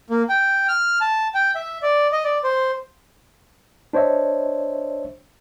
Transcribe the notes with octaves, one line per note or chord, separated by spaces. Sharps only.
A#3
G5
F6
A5
G5
E5
D5
D#5
D5
C5
D4 C5 C#5 D#5 E5